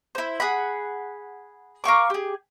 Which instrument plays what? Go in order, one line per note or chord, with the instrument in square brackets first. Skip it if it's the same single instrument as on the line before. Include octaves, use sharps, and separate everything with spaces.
[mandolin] E4 C5
G#4 F#5 B5
A#4 F5 C#6 D6
G4 G#4